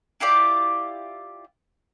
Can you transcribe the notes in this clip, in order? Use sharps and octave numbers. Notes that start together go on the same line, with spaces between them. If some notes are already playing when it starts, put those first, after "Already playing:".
E4 F4 G4 D5